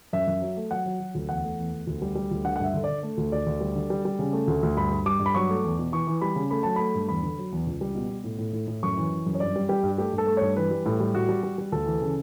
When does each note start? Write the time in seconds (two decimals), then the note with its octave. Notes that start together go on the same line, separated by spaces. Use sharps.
0.13 F#2 E5
0.27 F#2
0.42 F#3
0.57 A3
0.71 F#3 F#5
0.86 F#3
1.00 F#3
1.15 D2
1.29 E2 F#5
1.44 A3
1.58 E2
1.72 E2
1.87 D2
2.02 G3
2.15 G3
2.31 D2
2.44 D3 F#5
2.56 F#5
2.60 G2 E5
2.74 D3
2.84 D3 D5
3.03 A3
3.17 D2
3.32 D2 D5
3.46 D2
3.61 G3
3.75 D3
3.90 G3
4.05 G3
4.19 C#3
4.33 A3
4.48 D2
4.63 D2
4.77 G2 B5
4.91 G2
5.06 G3 D6
5.20 G2
5.26 B5
5.34 F#3 C#6
5.50 A3
5.64 E2
5.79 B2
5.92 E3 C#6
6.07 E3
6.21 G3 B5
6.36 C#3
6.51 A3 B5
6.63 F#3 A5
6.76 A3 B5
6.95 G2
7.09 E2 B5
7.23 D3
7.38 F#3
7.52 E2
7.67 C#2
7.81 G3
7.95 B2
8.10 B2
8.24 A2
8.39 A2
8.53 A2
8.67 A2
8.83 F#2 C#6
8.97 E3
9.11 E3
9.26 F#2
9.35 C#5
9.40 G2 D5
9.56 G3
9.69 G3 G4
9.84 G2
9.98 A3 G4
10.13 G2
10.18 A4
10.27 A3
10.37 G2 C#5
10.56 E3 B4
10.71 G3
10.86 A2
11.00 G3
11.14 A2 F#4
11.29 G3
11.43 G3
11.58 G3
11.72 D2 A4
11.86 E3
12.02 C#3